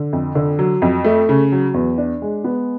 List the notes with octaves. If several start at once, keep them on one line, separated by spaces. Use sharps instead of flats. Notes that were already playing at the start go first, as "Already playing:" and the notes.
Already playing: D3
F2
D3
F#3
F2
A3
C#3
F#3
E2
D4
G#3
B3